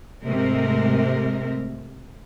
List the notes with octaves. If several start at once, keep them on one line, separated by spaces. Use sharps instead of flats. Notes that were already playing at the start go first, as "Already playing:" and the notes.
G#2 C3 G#3 A3 C4 A#4